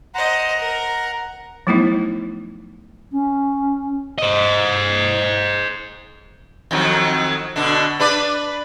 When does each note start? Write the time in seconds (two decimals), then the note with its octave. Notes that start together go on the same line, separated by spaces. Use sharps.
0.15 C5 D#5 F#5 A#5
0.60 A#4
1.67 F3 F#3 A3 B3 D#4 E4
3.12 C#4
4.19 C5 D#5
6.71 F2 D#3 F#3
7.56 B2 D3 D4
8.00 D4 B4 D5